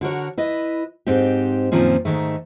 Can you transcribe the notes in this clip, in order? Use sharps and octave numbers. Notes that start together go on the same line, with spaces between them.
D3 F#4 A#4 C#5
E4 B4 D#5
G#2 C4 D#4 G4
F#2 A#2 D#3 F3 C4 C#4
G#2 D#3 A3